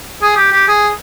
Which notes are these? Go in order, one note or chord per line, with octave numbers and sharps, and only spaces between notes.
G#4
G4
G4
G#4